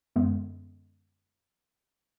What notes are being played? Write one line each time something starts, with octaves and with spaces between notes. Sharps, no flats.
F#2 D3 G#3 B3